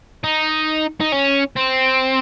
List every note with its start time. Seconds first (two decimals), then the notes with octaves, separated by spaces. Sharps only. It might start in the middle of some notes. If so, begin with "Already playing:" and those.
0.24 D#4
1.00 D#4
1.12 C#4
1.57 C4